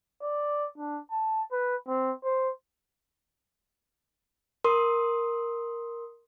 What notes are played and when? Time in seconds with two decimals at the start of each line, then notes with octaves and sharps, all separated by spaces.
0.23 D5
0.78 D4
1.11 A5
1.52 B4
1.88 C4
2.24 C5
4.64 A#4 C6 D#6